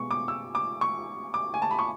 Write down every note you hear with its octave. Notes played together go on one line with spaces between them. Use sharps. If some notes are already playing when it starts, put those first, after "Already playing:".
Already playing: B2 G#3 B3 C#6
D6
E6
D6
C#6
D6
G#5
A5
B5
C#6